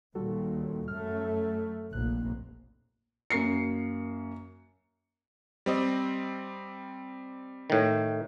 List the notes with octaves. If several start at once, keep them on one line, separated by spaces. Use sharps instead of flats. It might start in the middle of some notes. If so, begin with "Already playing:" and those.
D#2 A#2 G3 F#4 A4
F#2 A3 F6
F1 A#1 A#3 F#6
F#2 A#3 C7 C#7
G3 C4 D#5
A2 D#3